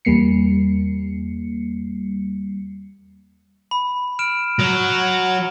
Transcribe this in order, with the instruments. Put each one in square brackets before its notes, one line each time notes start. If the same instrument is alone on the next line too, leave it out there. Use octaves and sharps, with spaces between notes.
[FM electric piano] E2 G3 A#3 C7 C#7
[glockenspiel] B5
F6 D7 E7
[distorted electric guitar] F#3